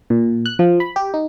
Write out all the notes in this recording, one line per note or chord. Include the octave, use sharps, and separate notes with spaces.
A#2
F#6
F3
B5
G4
D#4